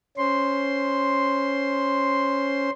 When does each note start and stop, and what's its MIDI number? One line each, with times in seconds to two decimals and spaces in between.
0.17 2.70 61
0.17 2.70 72
0.17 2.70 84